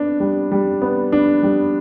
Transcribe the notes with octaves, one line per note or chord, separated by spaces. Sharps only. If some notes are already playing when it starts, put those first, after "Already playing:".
Already playing: B3 D4
G3
G3
B3
D4
G3